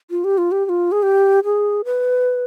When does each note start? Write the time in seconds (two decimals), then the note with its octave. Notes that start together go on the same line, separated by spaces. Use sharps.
0.10 F4
0.24 G4
0.38 F4
0.52 G4
0.65 G4
0.69 F4
0.92 G#4
1.03 G4
1.45 G#4
1.85 B4